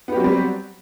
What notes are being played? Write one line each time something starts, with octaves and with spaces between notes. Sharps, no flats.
F#3 G3 B3 C4 G4